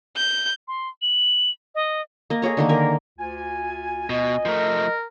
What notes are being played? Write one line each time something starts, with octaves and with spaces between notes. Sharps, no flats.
G6
C6
F#7
D#5
A#3 D#5
G#4 A4 C#5 A#5
D3 D#3 A#3
A#4 G#5
D2 F4 G#5
B2 D#5
F3 A3 A#4